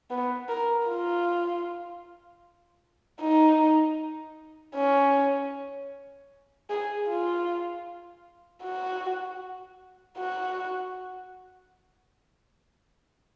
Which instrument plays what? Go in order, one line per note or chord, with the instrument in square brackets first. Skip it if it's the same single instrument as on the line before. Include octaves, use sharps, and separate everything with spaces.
[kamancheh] B3
A#4
F4
D#4
C#4
G#4
F4
F#4
F#4